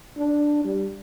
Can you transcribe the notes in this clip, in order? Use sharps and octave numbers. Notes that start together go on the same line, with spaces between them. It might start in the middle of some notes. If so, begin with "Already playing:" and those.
D4
G3